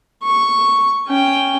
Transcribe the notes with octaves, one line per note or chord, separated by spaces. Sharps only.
C#6
C#4 G5